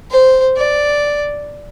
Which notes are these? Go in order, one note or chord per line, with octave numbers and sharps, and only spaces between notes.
C5
D5